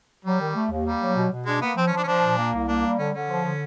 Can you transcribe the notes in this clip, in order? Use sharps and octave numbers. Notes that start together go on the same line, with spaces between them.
F#3 G3
D#3
A3
D#2
G3 A#3
F#3
B2
B2
G#3 D4
A#3 B3
F3 C4
C#4
F3 D4
C#4
F3 D4
A#2
A#3
C2
A#3 D4
G3
D3 C#4
D3 C#4
F3
D3